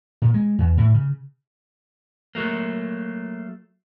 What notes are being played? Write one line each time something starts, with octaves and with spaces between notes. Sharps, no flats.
A#2
G#3
E2
A2
C#3
F#3 A3 A#3